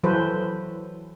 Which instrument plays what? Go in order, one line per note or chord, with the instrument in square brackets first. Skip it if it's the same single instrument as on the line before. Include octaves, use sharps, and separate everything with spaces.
[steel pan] E3 F#3 A4 B4 C5